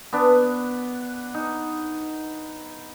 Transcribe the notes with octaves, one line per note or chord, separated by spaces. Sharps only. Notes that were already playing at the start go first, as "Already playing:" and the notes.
B3 D4
D#4